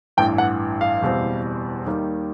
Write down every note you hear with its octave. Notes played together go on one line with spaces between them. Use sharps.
A1 G2 E3 G5
F#5
F5
F#1 E2 B2 G3 C4
D#2 D#3 G3 A#3